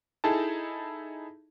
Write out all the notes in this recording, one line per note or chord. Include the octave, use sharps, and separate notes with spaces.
D#4 E4 G#4 A4 A5